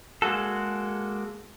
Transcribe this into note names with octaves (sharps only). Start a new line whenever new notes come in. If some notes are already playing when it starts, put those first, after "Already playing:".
G#3 A#3 F#4 A4